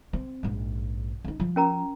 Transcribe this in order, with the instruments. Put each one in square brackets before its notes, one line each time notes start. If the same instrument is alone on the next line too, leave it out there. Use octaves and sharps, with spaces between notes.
[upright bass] C4
A#1 G#2
C#4 D#4
F3
[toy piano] C#4 A#4 A#5